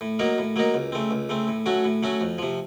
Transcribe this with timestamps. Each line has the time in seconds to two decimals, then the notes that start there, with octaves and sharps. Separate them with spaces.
0.01 A2
0.19 F#3 A#3 D#4 A#4
0.38 A2
0.56 F#3 A#3 D#4 A#4
0.74 C#2
0.92 C#3 A3 C4
1.11 C#2
1.29 C#3 A3 C4
1.48 A2
1.66 F#3 A3 C#4 F#4
1.84 A2
2.03 F#3 A3 C#4 F#4
2.21 F2
2.39 C3 F3